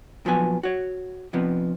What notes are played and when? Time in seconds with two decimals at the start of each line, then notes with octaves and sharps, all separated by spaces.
0.25 A#2 F3 F#3 B3 G#5
0.63 F#4 C#5
1.33 F2 C3 F3 B3